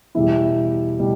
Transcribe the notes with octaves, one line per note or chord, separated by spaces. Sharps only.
E2 B2 G3 B3 E4 E5
B2 G3